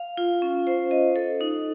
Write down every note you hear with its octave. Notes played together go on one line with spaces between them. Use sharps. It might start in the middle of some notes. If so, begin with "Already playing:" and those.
Already playing: F5
F4
C#4
C5
D#5
A4
D#4